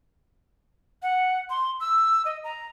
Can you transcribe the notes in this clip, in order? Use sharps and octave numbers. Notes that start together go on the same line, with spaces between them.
F#5
C6
E6
D#5
A#5